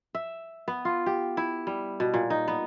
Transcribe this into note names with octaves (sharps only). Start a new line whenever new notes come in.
E5
B3
F4
G4
E4
G3
B2
A#2
D#4
B3